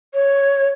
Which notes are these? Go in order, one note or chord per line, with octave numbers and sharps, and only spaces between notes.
C#5